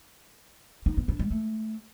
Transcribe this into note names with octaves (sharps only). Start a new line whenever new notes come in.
D#4
B3
D4
G#3
A3